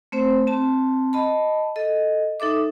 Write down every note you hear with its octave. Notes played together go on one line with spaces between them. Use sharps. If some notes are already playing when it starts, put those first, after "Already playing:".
A3 C4 C5
C4 A5
D#5 A5 B5
A4 D#5
D#4 A4 E5 D6